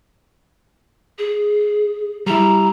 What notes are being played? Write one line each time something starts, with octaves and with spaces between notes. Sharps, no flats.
G#4
G3 E4 A#5